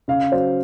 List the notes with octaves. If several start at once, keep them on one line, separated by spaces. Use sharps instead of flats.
C#3 F5
F#3 C5